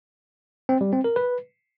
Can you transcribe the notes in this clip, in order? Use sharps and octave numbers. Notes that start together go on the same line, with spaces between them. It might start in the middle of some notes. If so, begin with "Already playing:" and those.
C4
G3
C4
A#4
B4